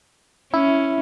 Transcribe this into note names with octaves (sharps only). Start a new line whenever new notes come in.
C#4 E4